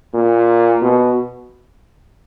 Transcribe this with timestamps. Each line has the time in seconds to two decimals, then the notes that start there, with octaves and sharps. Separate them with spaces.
0.14 A#2
0.82 B2